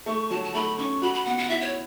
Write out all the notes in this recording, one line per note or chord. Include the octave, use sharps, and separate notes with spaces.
A3 C#6
F#3 A5
A5
A3 B5
C#4 C#6
F#4 B5
B5
B3 F#5
F#5
E4 E5
C#5